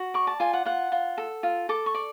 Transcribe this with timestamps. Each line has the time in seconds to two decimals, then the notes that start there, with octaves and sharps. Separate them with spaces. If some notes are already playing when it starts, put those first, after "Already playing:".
Already playing: F#4
0.14 D5 C#6
0.27 A5
0.40 F4 G#5
0.53 F#5
0.65 F4 F#5
0.92 F4
1.18 A4
1.43 F4
1.69 A4 D6
1.86 C#6
1.95 D5